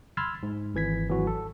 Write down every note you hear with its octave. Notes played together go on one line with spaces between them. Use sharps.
B5 C6 E6 F6 G#6 A6
G#2
G#1 E3 G#6 B6
G#1 E3 F#3 F#4
A4